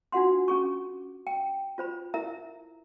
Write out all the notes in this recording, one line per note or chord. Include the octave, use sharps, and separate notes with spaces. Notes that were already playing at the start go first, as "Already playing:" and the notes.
D4 F4 F#4 F#5 C6
C#4 G#4 C#6
G5
F4 C5 B5
E4 A#4 E5 A#5